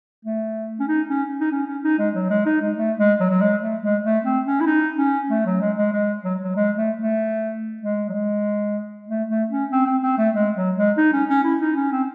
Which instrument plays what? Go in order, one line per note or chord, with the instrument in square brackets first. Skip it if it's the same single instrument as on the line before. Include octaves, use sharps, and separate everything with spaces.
[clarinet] A3
C#4
D#4
C#4
D#4
C#4
C#4
D#4
G#3
F#3
G#3
D#4
G#3
A3
G#3
F#3
F#3
G#3
A3
G#3
A3
C4
C#4
E4
D#4
C#4
A3
F#3
G#3
G#3
G#3
F#3
F#3
G#3
A3
A3
G#3
F#3
G#3
A3
A3
C#4
C4
C4
C4
A3
G#3
F#3
G#3
D#4
C#4
C#4
E4
D#4
C#4
C4